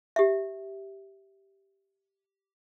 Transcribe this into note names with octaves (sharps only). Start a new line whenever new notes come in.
G4 E5